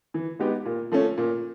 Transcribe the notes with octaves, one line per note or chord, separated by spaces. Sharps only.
E3
G#3 B3 D#4 G4
A#2
F3 A3 C#4
A#2